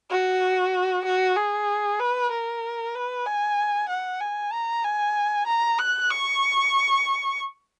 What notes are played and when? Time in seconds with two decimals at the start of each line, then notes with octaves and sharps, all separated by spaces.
0.10 F#4
1.05 F#4
1.36 G#4
1.99 B4
2.31 A#4
2.95 B4
3.26 G#5
3.89 F#5
4.21 G#5
4.52 A#5
4.84 G#5
5.47 A#5
5.78 F#6
6.10 C#6